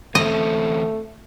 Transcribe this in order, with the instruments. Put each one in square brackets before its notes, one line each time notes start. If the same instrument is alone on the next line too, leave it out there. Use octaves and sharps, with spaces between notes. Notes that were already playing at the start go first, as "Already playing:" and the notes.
[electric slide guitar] E3 C4 C#4 [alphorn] A3 [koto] D#5